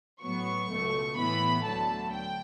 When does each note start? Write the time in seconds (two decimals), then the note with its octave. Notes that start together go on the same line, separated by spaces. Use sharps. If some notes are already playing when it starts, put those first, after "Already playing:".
0.23 A2 F#3 B3 C#6
0.71 C#2 B2 A3
1.18 A2 E3 B3 B5
1.66 D2 D3 F#3 A3 A5
2.13 G5